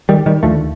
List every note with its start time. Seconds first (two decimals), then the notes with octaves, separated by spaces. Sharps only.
0.09 D#3 G3
0.26 D#3 G3
0.43 D#2 D3 F3 A3